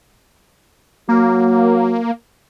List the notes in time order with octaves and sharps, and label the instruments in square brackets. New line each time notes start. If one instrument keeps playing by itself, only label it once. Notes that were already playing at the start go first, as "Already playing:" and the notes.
[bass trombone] F#3 [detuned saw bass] A#3